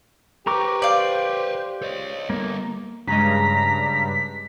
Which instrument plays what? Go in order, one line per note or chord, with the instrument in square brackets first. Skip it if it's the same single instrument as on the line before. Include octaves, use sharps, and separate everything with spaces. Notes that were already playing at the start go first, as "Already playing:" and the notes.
[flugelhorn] G4 [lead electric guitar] A#4 B4 [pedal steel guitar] A#5 C#6 D6
[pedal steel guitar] C5 [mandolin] D5 F5
[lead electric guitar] C#5 D#5
[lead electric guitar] G3 B3 [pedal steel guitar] A#3
[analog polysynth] G2 [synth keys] C#3 G#3 [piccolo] A#5 [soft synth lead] B6